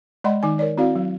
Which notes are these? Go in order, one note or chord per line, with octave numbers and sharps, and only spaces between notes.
G#3 D5 D#5 F#5 B5 C6
D#3 D#4 G#5
A#4 C#5 D5
C4 E4 F#4 D5 F5
F#3